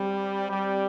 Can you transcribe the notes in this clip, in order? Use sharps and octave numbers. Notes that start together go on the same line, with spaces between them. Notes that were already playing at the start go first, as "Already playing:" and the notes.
Already playing: G3 C4
G3